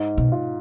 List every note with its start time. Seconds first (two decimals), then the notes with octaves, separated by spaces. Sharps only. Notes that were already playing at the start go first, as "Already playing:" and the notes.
Already playing: G#2
0.17 B2
0.32 F4